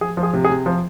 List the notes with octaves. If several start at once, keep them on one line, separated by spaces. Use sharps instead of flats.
F3 G#4
F3
G#4
C3
G#4
C3
F3